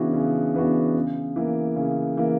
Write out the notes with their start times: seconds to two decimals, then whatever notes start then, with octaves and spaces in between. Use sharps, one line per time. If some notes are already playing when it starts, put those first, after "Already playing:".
Already playing: C#3 E3 B3 D4 F#4
0.13 C#3
0.54 E3 B3 D4 F#4
0.95 C#3
1.36 E3 A#3
1.76 C#3
2.17 E3 A#3